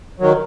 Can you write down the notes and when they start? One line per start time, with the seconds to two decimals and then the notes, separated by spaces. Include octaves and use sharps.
0.20 D#3 F#3